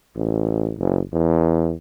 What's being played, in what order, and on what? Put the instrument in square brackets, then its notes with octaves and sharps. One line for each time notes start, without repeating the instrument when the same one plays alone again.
[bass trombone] A1
F#1
E2